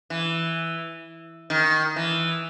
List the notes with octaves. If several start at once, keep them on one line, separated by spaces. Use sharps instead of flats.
E3
D#3
E3